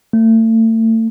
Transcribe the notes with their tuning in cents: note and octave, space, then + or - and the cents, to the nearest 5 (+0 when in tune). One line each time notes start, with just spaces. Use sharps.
A3 +35